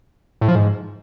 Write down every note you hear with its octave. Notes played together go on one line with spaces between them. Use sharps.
A2
F3
G#2